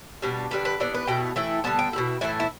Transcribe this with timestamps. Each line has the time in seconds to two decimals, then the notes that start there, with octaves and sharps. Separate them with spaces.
0.22 B2 G3 D4
0.51 D3 G3 D4 B4
0.65 B4
0.80 E3 B3 D4 D5
0.94 B4
1.07 B2 A3 E4 G5
1.36 E3 A3 E4 G5
1.64 D3 G3 B3 A5
1.79 G5
1.93 B2 G3 E4
2.21 A2 E3 A3 E4
2.40 E4